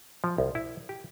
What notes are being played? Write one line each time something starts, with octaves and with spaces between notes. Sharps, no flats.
F3
C2
E4
G4